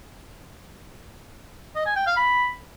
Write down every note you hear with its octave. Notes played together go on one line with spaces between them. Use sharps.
D#5
G#5
G5
F5
B5